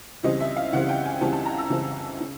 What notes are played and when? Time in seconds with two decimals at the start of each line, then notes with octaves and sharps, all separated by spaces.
0.23 C#2 C#3 E3 G3 C4 D#5
0.40 E5
0.56 F5
0.73 C#2 C#3 E3 G3 C4 F#5
0.89 G5
1.05 G#5
1.21 C#2 C#3 E3 G3 C4 A5
1.33 A5
1.45 A#5
1.58 E6
1.70 C#2 C#3 E3 G3 C4
2.21 C#3